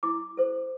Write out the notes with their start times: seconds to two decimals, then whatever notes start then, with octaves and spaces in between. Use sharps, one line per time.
0.03 E4 D6
0.37 A4 C5